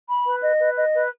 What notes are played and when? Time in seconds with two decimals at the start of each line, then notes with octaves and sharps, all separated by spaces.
0.09 B5
0.26 B4
0.43 D#5
0.60 B4
0.77 D#5
0.94 B4